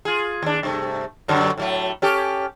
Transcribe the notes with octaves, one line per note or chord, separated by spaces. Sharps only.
F4 G#4
D#2 D4
G2 C3 A3
F#2 D3 F#3
A2 F#3 A3
C#4 G4 A4